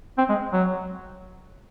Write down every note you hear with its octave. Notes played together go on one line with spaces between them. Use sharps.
C4
G#3
F#3